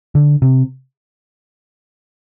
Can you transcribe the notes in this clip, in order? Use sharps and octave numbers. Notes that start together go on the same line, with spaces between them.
D3
C3